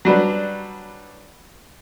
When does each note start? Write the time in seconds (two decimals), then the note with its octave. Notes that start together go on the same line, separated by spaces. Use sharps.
0.05 F#3 G3 D4 B4